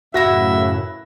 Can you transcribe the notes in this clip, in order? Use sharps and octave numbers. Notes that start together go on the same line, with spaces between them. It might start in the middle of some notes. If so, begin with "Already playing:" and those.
F#2 A2 C#3 E4 F#4 B4 E5 A#6